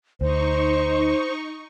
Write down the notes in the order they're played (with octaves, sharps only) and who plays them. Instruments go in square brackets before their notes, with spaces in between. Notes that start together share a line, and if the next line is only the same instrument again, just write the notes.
[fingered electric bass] D2 [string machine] D#4 C#6 [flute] C5